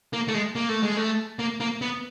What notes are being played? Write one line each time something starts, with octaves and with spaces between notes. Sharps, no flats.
A#3
A3
G#3
A#3
A3
G#3
A3
A#3
A#3
B3